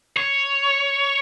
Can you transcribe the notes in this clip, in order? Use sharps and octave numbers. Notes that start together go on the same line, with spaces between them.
C#5